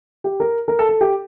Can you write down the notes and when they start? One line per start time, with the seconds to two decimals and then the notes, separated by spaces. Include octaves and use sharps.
0.24 G4
0.40 A#4
0.68 A#4
0.79 A4
0.89 A4
1.01 G4